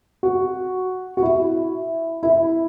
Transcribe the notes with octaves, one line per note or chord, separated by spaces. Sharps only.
F#4
F#4
E4
E4